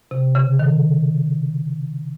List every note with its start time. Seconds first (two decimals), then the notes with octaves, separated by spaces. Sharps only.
0.11 C3
0.35 C#3
0.59 D#3